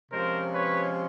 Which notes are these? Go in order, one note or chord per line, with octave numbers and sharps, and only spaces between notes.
C3 F3 G#3 C#4 A#4 C5
B4 C#5